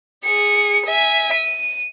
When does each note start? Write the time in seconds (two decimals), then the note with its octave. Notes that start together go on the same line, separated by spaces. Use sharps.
0.24 G#4 C#7
0.86 E5 G#5
1.33 D#7